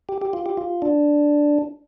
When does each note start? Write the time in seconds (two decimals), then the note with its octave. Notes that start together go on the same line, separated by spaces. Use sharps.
0.09 G4
0.22 G4
0.33 F4
0.46 G4
0.57 F4
0.82 D4